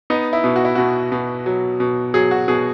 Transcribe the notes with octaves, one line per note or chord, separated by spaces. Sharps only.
B3 D#4
E4
B2
F#4
E4
B2 F#4
B2
F#3
B2
F#3 G#4
F#4
B2 G#4